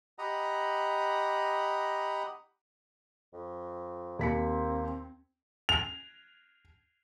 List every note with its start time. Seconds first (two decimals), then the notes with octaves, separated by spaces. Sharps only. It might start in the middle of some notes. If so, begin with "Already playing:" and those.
0.19 G4 D#5 F#5 A#5 B5 D#6
3.34 F2
4.19 D#2 A#3 C4 B6 C#7
5.69 F7